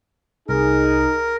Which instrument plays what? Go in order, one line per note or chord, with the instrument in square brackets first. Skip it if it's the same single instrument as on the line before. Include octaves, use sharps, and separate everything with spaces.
[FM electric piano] C2 [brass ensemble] D#4 G#4 [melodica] A#4